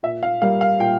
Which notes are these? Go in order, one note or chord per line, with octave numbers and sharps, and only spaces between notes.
A#2 E5
F5
G3 A#3 F5
F5
A#2 G5